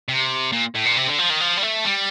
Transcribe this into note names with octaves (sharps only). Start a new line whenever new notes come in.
C3
A#2
A2
A#2
C3
D3
F3
D#3
F3
G3
A3
G3